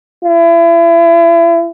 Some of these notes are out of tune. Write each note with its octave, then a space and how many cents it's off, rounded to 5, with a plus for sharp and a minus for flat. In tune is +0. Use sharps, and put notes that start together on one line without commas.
E4 +35